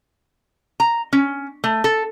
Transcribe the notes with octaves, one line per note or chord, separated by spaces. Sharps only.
A#5
C#4
A3
A4